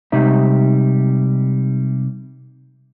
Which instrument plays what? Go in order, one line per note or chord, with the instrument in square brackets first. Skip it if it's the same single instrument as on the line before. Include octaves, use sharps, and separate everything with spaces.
[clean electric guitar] C3 G3 G#3 D#4 E5